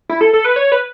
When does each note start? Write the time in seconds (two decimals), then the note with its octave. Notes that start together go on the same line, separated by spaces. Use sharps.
0.09 E4
0.21 A4
0.33 A4
0.45 B4
0.56 C#5
0.72 B4